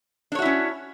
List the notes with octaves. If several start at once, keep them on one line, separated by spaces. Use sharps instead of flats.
C#4 D4 E4 F#4 C#5